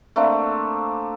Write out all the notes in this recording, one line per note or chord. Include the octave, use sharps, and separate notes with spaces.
A3 A#3 C4 D4